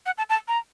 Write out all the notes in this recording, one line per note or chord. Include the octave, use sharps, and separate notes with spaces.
F#5
A5
A5
A#5